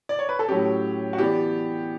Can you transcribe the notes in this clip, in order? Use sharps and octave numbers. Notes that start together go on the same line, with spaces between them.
D5
C#5
B4
A4
A2 F#3 C#4 G4
F#4
E3 B3 D4 G4